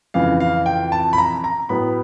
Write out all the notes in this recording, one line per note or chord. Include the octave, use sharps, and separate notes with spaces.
F2 C#3 E3 F5
F5
G5
A5
B5
A#5
A#5
A2 F#3 B3 B5